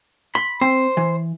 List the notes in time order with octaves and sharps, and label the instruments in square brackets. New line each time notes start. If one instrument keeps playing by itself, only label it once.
[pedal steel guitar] B5 [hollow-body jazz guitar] C6
[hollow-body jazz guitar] C4 [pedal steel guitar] C5
[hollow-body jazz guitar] E3